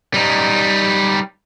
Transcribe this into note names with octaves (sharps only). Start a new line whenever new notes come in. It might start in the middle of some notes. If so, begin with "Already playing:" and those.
G3 D#4